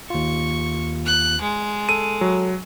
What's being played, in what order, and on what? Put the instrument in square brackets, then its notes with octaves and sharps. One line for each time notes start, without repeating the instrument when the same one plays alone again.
[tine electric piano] D#2 F4 [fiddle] C#6
[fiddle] F#6
G#3
[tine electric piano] A4 [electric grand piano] D#7
[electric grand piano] F#3